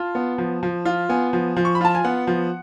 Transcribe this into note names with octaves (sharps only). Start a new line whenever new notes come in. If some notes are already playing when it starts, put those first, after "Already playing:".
Already playing: F4 A5
B3
F3
F3
F4
B3 G#5
F3
F3
C#6
B5
F4 A5
G#5
B3 F#5
F3